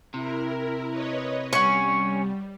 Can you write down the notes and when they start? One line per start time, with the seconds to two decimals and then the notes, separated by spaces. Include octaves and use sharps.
0.14 C3 E4 A#4
0.90 B4 C#5 D#5
1.53 G3 C#4 F#5 C#6